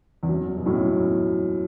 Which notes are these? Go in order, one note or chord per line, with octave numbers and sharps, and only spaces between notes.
E2
F#2
B2
F#2 A2